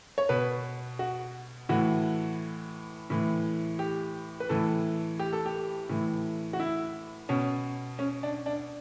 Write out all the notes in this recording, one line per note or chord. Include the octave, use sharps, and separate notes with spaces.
C#5
B2 B4
F#4
A2 E3 F#4
A2 E3
G4
B4
A2 E3 A4
G4
A4
G4
A2 E3
F#4
E4
B2 C#4
C#4
D4
D4